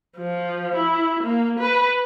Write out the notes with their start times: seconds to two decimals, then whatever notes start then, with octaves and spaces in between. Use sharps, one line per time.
0.18 F3
0.76 E4
1.24 A#3
1.59 B4